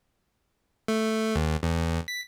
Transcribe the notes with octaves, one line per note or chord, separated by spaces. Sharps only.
A3
D#2
E2
B6